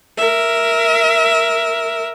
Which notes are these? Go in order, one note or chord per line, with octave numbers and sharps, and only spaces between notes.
A#4 E5